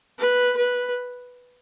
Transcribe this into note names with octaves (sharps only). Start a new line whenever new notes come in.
B4
B4